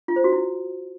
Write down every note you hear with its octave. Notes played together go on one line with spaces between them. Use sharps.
F4
C5
F#4
E4